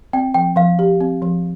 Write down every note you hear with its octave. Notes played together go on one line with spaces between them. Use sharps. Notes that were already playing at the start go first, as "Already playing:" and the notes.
C4 G5
F3 G5
F3 F5
G4
C4
F3